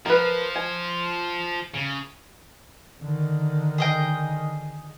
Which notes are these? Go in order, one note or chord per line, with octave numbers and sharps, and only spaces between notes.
F3 A#4 B4
G#5
C#3
D3 D#3
G#4 D#5 G5